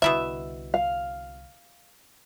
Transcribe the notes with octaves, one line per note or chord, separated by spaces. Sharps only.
C2 B2 D3 E4 E5
F5